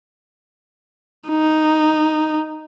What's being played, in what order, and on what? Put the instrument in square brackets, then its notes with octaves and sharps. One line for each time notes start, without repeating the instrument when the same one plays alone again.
[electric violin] D#4